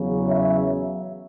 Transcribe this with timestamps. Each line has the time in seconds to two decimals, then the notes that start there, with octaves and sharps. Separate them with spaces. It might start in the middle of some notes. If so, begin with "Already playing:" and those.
Already playing: E2 C#3 F#3
0.29 C#5 E5